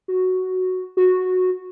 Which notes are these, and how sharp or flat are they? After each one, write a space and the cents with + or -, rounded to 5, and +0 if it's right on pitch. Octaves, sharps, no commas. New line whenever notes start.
F#4 +0
F#4 -10